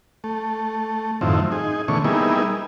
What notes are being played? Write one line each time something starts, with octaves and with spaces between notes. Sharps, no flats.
A3
F#2 A2 D#3 F3 C4 E4
D#4 G#4
B2 D3 E3 A3 C#4 C#6
G3 A#3 B3 D#4 E4 G#4